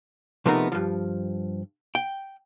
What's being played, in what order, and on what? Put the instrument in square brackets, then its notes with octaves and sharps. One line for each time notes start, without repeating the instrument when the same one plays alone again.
[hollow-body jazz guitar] C3 F3 A3 B3 D#4 A#4
G2 F3
G5